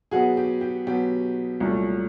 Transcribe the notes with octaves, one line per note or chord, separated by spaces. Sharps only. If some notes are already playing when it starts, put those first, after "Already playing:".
B2 F#3 B3 F#4 G#4
G4
G4
B2 F#3 B3 G4
C2 A#2 F#3 A3